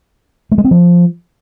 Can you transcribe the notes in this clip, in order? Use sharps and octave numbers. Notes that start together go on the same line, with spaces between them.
A3
G#3
C4
F3